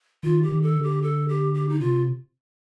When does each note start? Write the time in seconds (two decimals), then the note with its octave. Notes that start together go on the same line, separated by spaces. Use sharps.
0.23 D#3 F4
0.43 G4
0.49 D#3
0.62 A4
0.76 D3
0.83 G4
1.02 A4
1.29 G4
1.54 G4
1.69 D#4
1.80 C3 F4